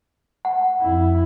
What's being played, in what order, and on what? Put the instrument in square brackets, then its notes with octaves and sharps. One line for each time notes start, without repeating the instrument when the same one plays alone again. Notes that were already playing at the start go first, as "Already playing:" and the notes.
[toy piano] F#5
[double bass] F2 E4